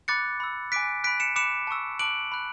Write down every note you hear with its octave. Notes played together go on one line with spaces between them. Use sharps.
B5 D6 F#6 A6 C#7
B5 E6
G#5 D6 F#6 B6 D7
B5 F#6 B6 D7
C#7 E7
B5 D6 F#6 C#7 E7
A5 C#6 E6
A5 D6 F#6 D7 F#7
B5 F#6